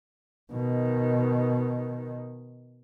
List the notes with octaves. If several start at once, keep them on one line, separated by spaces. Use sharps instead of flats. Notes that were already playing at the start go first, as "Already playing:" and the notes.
B2 D#3